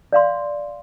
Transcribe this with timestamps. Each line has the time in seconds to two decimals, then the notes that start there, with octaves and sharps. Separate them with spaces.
0.13 D5 F5 C6